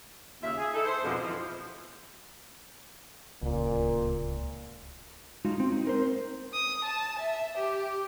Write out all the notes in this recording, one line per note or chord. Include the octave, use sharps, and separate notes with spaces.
D#2 C#3 F4 E5
G#4
D#4 E4 A4
C5
F2 G#2 B2 D3 F3
E3 F3
D1 C#2 A#2
G#3 D#4 F4 F#4
C4
D#4
C4 A#4 C5
D#6
A5
E5
G4